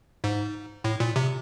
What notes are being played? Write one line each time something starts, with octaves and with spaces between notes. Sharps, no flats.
G#2
A2
A#2
C3